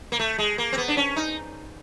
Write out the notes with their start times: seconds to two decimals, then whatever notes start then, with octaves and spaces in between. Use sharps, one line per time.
0.12 A#3
0.19 A3
0.38 G#3
0.58 A#3
0.73 C4
0.78 B3
0.88 D4
0.97 C#4
1.16 D#4